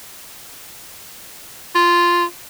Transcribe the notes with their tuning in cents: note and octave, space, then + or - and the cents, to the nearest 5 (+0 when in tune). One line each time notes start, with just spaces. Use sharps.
F4 -5